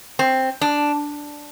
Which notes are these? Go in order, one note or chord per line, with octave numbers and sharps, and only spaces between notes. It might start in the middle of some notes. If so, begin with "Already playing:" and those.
C4
D4